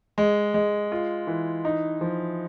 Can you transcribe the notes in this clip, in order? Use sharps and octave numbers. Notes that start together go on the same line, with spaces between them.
G#3
G#3
F4
E3
D#4
F3